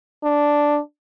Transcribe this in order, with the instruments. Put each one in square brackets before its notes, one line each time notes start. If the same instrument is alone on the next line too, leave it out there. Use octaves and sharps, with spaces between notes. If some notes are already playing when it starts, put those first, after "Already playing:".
[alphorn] D4